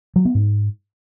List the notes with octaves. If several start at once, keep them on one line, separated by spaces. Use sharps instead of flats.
F#3
B3
G#2